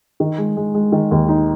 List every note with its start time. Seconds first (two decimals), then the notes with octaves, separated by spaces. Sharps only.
0.20 D#3
0.38 G#3
0.57 G#3
0.74 G#3
0.92 D#3
1.11 D#2
1.29 D#4